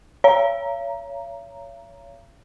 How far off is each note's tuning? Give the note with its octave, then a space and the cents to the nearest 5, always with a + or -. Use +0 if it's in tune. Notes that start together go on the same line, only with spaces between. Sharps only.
C#5 +25 F5 -45 A#5 +0